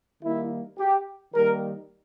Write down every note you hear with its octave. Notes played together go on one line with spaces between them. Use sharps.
D#3 G3 A#3 E4
G4
D#3 G3 A#3 A#4